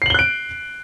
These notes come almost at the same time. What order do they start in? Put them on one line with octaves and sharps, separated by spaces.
C7 F#7 G7 F#6 D7